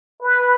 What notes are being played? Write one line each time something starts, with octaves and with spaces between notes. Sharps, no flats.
B4